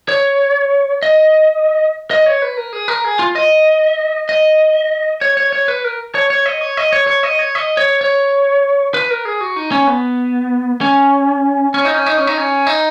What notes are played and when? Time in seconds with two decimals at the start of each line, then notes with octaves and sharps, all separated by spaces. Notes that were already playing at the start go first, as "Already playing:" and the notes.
0.09 C#5
1.03 D#5
2.11 D#5
2.26 C#5
2.42 B4
2.57 A#4
2.73 G#4
2.88 A#4
3.04 G#4
3.19 F4
3.36 D#5
4.29 D#5
5.21 C#5
5.37 C#5
5.53 C#5
5.68 B4
5.84 A#4
6.15 C#5
6.30 C#5
6.46 D#5
6.61 C#5
6.77 D#5
6.93 C#5
7.07 C#5
7.23 D#5
7.39 C#5
7.55 D#5
7.77 C#5
8.01 C#5
8.94 B4
9.10 A#4
9.25 G#4
9.41 F#4
9.56 D#4
9.72 C#4
9.87 B3
10.81 C#4
11.74 C#4
11.85 D#4
11.95 C#4
12.06 D#4
12.17 C#4
12.27 D#4
12.38 C#4
12.67 D#4